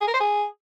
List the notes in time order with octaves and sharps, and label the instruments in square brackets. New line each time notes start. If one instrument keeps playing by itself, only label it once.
[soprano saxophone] G#4
A#4
C5
G#4